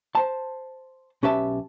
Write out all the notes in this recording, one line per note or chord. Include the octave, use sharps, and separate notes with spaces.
C5 A5
B1 C#4 G4 B4 E5 A5